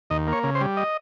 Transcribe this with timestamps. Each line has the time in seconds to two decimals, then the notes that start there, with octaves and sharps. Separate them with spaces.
0.10 D#2 D#5
0.28 A#3 C#5
0.43 C#3
0.55 C5
0.61 G3
0.77 D#5